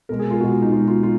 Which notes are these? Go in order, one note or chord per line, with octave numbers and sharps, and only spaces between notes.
B2 G#3 A#4
G#4
F4
B2 G#3 F#4
D#4
B2 G#3 F4
F4
F4